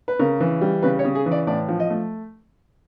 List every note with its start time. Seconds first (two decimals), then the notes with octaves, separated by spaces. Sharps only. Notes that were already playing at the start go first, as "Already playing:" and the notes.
0.08 B4
0.19 C#3 A#4
0.40 E3
0.61 G3
0.83 C#3 B4
0.99 C#5
1.05 C#3
1.15 G#4
1.26 E3
1.32 D5
1.47 A2 D5
1.69 F3
1.80 D#5
1.90 A3